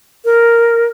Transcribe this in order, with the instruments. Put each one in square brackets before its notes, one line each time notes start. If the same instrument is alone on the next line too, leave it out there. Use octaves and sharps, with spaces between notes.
[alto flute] A#4